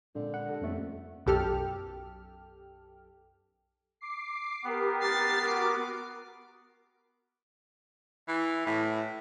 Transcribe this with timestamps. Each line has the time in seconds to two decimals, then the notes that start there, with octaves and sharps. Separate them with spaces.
0.15 A#2 D3 G#3 C4
0.34 F#5 B5 F#6
0.46 G4 A4 D#5
0.61 D#1 F2 A3
1.26 B1 F#2 G4 A4 F6
4.01 D6 C7
4.64 B3 G4 A#4
5.02 A6 C7
5.48 F#4 A#4 D6
8.28 E3
8.66 A2